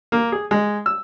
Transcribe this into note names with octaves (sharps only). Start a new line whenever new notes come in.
A#3
G#4
G#3
E6